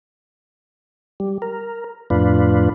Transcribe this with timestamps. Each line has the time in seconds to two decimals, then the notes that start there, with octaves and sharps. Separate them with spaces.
1.20 G3
1.42 A#4
2.10 F2 A2 D4 F4 B4